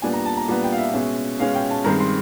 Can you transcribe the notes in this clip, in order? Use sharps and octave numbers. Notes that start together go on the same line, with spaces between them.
A#2 G3 B3 D4 G#5
A#5
A5
A#5
A#2 G3 B3 D4
G5
F5
E5
B2 G#3 C#4 E5
B2 G#3 C#4 F5
G5
A5
G2 D#3 G#3 C4 A#5
C6